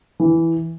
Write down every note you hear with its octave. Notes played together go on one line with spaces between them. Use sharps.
E3